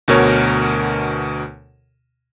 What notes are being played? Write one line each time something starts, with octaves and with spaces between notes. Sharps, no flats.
D2 B2 A#4 C#5